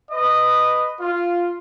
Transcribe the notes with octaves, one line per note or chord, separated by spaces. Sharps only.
B4 D#5
F4